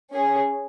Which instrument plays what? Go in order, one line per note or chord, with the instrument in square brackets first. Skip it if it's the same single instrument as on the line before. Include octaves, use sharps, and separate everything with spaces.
[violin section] C#4 G#4